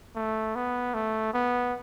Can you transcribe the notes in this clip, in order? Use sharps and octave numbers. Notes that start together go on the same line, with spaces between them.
A3
B3
A3
B3